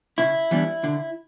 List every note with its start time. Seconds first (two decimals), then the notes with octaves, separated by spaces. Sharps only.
0.18 C#3 E4
0.51 E3 G3 B3 D4
0.84 D3